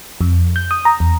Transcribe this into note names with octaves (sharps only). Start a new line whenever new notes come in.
F2
G6
D#6
A#5
E2